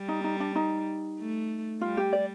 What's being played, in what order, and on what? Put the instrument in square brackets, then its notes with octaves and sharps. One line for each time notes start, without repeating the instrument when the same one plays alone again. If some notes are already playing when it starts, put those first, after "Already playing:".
Already playing: [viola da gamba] G3
[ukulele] D#4
D#4
D4
D#4
[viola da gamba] A3
[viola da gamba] G3 [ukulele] F4
[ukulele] G4
D5